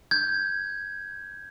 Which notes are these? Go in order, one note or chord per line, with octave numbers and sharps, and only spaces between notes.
G6 G#6